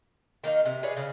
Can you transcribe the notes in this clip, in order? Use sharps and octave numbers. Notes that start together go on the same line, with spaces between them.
D#3 A#3 C#4 D#4
C3
G#4 B4 C#5 D5
C#3